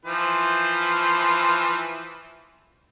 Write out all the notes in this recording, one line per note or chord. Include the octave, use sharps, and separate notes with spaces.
E3 F3 C5